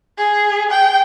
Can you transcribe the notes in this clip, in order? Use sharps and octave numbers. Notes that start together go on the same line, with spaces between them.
G#4
G5